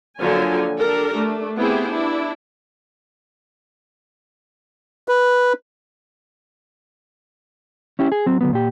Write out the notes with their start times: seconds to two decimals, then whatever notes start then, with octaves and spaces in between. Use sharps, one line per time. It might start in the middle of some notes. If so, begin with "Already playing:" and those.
0.20 D3 F3 F#3 A#3 C#5 G#5
0.78 D4 G4 A4 A#4
1.14 A3 D4
1.57 B3 C4 E4 G4 G#4 C5
1.88 D4 E4
5.08 B4
7.99 C#4 E4 G4
8.12 G#4
8.26 F#3 C4
8.41 D2 F#3 B3
8.53 A#2 G4